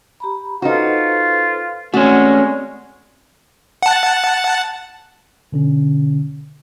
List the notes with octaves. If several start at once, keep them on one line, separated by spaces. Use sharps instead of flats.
G4 A#5 B5
D#4 F4 F#4 A4 B4 C5
G#3 A3 C4 C#4 F#4 D5
F#5 A5
B2 D3 C#4